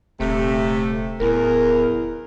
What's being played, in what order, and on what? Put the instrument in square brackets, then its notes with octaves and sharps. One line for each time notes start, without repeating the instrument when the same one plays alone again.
[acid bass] D#1 [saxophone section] C3 A3
[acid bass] D1 [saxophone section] E2 A#4